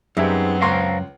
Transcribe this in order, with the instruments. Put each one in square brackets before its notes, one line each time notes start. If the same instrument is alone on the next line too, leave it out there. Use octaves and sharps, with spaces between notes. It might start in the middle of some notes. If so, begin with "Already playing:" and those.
[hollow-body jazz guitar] F#2 [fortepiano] G3 E5 [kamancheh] B3 C4 [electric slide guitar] D#4 G#4
[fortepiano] C#2 C6 C#6 [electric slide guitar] C5 F5 A#5